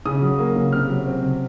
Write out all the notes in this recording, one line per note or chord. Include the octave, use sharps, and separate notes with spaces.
C#3 D#6
F#3
A#3
C#3
C3 F6
F#3
C4
C3